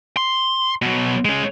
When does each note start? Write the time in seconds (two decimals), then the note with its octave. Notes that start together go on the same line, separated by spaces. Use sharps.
0.17 C6
0.82 B2 F#3
1.25 G#3 C#4